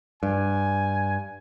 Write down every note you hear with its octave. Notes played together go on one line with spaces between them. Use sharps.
G2 G#5